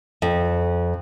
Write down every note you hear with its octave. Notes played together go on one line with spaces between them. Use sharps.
F2